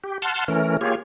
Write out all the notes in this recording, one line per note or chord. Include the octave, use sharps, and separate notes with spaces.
G4
F#5 A5 C6 F6
E3 A3 C#4 A#4
A#3 F4 G4 G#4 C#5